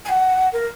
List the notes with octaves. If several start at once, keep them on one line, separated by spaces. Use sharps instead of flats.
G#5
F#5
A#4